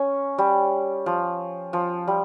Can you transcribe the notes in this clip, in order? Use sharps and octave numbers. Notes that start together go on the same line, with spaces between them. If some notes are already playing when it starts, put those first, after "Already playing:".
Already playing: C#4
G3
F3
F3
G3